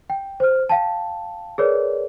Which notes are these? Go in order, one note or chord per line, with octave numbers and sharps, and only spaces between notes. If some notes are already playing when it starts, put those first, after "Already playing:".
G5
C5 F6
F5 G5 A5
G#4 A#4 B4 C#5 D5